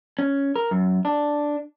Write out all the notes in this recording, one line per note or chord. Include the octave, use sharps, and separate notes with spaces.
C#4
A#4
F#2
D4